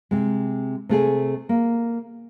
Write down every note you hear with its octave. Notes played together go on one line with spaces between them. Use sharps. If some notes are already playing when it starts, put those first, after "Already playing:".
C3 G#3
C3 A3 G#4 G#5
A#3